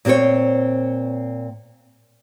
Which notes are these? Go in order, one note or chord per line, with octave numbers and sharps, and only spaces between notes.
A#2 C4 F#4 C5 C#5